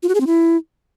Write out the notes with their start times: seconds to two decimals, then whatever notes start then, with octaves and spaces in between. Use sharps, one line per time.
0.03 F4
0.09 F#4
0.15 G#4
0.21 C4
0.27 E4